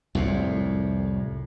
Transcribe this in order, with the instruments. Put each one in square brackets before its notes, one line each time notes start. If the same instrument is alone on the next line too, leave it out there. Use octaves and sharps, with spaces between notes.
[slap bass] C2 F2 A2